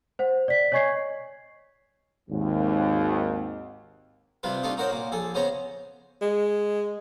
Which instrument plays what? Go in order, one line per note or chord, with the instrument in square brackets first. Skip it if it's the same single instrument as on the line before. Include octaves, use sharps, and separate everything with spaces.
[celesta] C5 F#5
D5 B6
C#5 D#5 G#5 C#6 G#6 C7
[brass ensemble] G#1 D#2
[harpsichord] C3 G3 F4 B4
A3 D4 D#4 F4 G4
D#4 F#4 A#4 C5 C#5
A#2 A#3
A#1 G#4 A4
C#3 B3 C#4 C5 C#5 A#5
[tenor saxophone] G#3